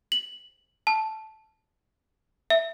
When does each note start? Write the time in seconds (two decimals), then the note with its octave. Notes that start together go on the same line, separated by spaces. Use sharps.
0.12 F#7
0.87 A5
2.50 E5